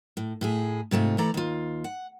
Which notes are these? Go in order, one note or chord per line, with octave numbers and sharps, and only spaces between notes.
A2
A2 E4 G#4
G#2 C3 A3 F4
E3 A3 A4 D5 A#5
D#2 F4
F#5